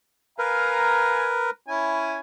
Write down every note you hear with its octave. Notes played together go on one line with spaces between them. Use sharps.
A#4 B4 F5 G#5 A#5
C#4 E4 G#5